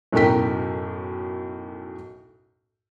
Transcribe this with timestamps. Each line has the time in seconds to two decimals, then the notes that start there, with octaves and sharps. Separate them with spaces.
0.13 B1 F#2 A2 A#4 G5 B6